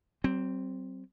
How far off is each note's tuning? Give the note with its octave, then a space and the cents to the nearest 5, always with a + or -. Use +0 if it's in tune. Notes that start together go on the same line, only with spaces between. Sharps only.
F#3 +45 C4 +0